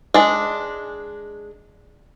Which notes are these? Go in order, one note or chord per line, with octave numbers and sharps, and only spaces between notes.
G#3 D4